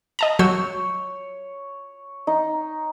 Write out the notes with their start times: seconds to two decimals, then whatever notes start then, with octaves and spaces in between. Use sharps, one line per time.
0.19 D#5 A5 A#5
0.39 F#3 C#5 E6 G6
2.27 D#4